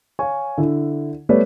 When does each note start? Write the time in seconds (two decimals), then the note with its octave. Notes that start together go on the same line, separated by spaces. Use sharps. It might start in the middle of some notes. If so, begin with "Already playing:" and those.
0.19 C#5 F5 G#5 C#6
0.58 D3 E4
1.29 G3 A3 B3 B4 C#5 D5